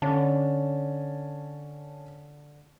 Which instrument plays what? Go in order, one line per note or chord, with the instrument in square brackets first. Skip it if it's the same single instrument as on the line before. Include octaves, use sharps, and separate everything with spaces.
[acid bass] D3 [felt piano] C#4 A5